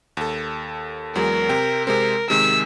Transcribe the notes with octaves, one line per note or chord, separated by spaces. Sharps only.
D#2 A4
E2 F#3 G#3 A#4
C3 C4 G5
C3 G#3 C4 A#4
C3 D#3 G#3 E6